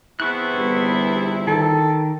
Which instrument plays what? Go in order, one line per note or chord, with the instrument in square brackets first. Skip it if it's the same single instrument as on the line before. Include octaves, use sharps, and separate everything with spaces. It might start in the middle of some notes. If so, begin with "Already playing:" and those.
[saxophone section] E2 C4 E4 [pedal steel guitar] B3 C#6 F#6
[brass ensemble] G1
[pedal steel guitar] D#3 [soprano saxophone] A4